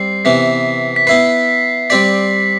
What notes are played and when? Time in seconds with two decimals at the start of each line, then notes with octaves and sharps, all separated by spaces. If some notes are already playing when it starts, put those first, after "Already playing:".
Already playing: G3 C4 C7
0.25 C3 E3 B3 B6
0.96 B6
1.07 B3 E4 B4 C7
1.90 G3 C4 G4 D5 B6